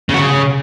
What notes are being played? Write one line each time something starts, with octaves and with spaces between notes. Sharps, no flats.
C#3
F#4
C#3